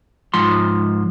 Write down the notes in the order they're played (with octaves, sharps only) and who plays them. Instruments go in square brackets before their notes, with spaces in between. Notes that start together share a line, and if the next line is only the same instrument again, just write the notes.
[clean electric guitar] G#2 F3 C6